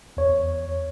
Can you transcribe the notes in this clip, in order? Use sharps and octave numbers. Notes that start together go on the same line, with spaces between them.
E2 C#5